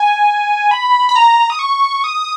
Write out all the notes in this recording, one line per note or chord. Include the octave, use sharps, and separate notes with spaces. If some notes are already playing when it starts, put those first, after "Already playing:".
Already playing: G#5
B5
B5
A#5
D#6
C#6
D#6